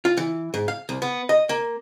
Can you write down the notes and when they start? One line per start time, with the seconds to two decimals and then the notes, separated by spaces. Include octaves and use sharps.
0.05 F4
0.17 E3
0.54 G#2
0.68 F5
0.89 C2
1.02 B3
1.29 D#5
1.49 A#3